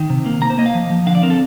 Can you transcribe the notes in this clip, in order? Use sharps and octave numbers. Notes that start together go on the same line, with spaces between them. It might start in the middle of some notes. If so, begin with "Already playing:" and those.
Already playing: D#3
C3
A#3
A#3 A#5
C5
A#3 D#5
F5
F3
F3
D3 F5
D5
C4 A#4
A4